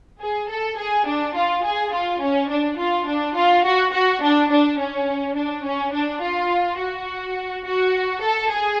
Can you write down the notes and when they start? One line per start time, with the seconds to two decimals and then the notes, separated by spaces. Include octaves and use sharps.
0.21 G#4
0.49 A4
0.78 G#4
1.06 D4
1.36 F4
1.65 G#4
1.93 F4
2.21 C#4
2.50 D4
2.78 F4
3.07 D4
3.35 F4
3.65 F#4
3.92 F#4
4.22 D4
4.50 D4
4.78 C#4
5.36 D4
5.65 C#4
5.93 D4
6.22 F4
6.78 F#4
7.64 F#4
8.21 A4
8.50 G#4